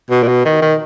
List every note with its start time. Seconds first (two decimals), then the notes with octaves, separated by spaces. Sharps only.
0.11 B2
0.23 A#2
0.28 B2
0.45 D#3
0.62 D#3